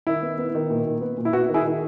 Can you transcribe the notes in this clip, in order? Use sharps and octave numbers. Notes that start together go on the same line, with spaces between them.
D#3 E4
B3
B3
D#3
A#2
A#2
B3
A#2
E4
B3 F#4
D#3
E4 G#4
D#3